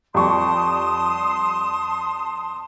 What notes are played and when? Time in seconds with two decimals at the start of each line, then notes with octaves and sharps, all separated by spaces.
0.14 F2 G3 A5 C6 C#6 D#6